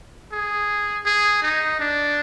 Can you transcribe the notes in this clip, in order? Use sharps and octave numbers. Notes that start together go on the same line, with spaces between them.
G#4
G#4
D#4
D4